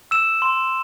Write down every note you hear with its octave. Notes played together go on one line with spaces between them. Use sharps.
E6 E7
C6